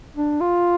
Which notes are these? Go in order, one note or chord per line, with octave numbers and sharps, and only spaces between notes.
D4
F4